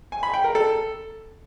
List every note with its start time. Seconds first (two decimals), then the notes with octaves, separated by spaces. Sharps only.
0.12 G#5
0.23 B5
0.34 G5
0.44 A#4
0.55 A4